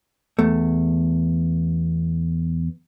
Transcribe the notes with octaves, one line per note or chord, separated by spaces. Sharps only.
E2 A3